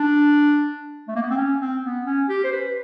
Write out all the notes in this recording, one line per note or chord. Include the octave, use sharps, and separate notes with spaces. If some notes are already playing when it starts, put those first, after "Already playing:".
Already playing: D4
A3
A#3
B3
C4
C#4
C4
B3
C#4
G4
C5
B4